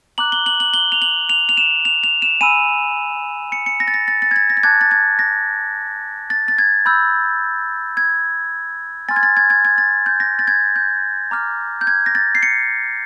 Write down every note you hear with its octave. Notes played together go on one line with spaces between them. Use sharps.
A#5 D6 F#6 F#7
G7
F#7
F#7
G7
F7
F#7
F7
F7
E7
F7
F7
E7
G#5 B5 E6 D#7
C#7
C#7
A#6
A6
A#6
A6
A6
G#6
A6
A#6
A6
A5 D6 F#6 G#6
A6
G#6
A#6
A6
A6
G#6
B5 E6 G6
G#6
G#5 C6 F6 A6
G#6
A6
G#6
G#6
G#6
A6
G6
A#6
A6
G#6
G6
A#5 D6 F6
G6
G#6
A#6
A6
C7
C#7